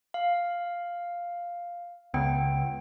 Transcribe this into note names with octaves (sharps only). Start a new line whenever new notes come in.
F5
C#2 B3 G5